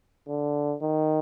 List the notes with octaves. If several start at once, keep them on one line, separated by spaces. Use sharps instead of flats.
D3
D#3